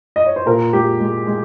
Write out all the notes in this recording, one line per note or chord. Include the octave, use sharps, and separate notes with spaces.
D#5
C#5
C5
A#2 A#4
G#3 G4
G#3
G#3